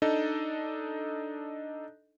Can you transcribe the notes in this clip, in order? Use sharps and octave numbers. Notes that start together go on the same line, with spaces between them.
D4 D#4 A4 D#5